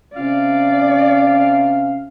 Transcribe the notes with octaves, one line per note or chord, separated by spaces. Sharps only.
C3 C#4 D5 F5